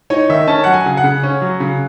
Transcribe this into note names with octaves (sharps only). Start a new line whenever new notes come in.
D#4 C#5
D#3 E5
C#4 A5
F#3 F#5
G#5
C#3
F#5
C#3
C#4
F#3
C#3